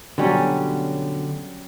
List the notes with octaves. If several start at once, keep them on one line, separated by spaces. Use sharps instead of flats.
B2 D3 F#3 G3 C#4